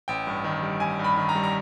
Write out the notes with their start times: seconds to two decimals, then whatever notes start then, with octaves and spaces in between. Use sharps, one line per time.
0.08 A1 G5
0.27 G2
0.44 D#3
0.62 G3
0.80 A1 G#5
0.99 G2
1.04 B5
1.17 D#3
1.29 A#5
1.35 G3
1.43 A#5